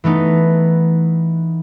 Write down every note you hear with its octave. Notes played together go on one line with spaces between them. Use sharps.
E3 A3 B3 D#4